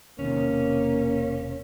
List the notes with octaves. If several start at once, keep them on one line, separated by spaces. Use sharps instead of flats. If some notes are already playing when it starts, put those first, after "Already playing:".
E1 C3 D#3 A#3 C#4